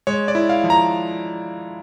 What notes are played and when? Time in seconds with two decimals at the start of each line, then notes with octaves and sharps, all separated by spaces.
0.07 G#3 C#5
0.28 D5
0.35 E4
0.49 F5
0.64 F3
0.70 A#5